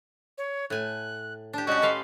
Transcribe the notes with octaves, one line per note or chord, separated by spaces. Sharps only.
C#5
A2 G#5 F#6
D4 G4 A5
G#3 C#4 F#4 G4 D5 D#5
A4 B4 F5 C6